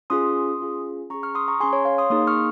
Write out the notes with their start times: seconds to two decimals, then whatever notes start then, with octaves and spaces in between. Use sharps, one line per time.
0.10 C#4 F4 G#4 C6 D#6
0.60 C#4 F4 G#4
1.10 C#4 A#5 C#6
1.14 G#4
1.23 C#6 F6
1.35 C6 D#6
1.48 A#5 C#6
1.60 C#4 G#4 G#5 C6
1.73 C#5
1.85 C#5 F5
1.98 C6 D#6
2.10 A#3 D#4 G#4 C6 D#6
2.27 C#6 F6